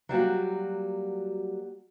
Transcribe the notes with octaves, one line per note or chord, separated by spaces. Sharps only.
F#3 G3 A#3 F#4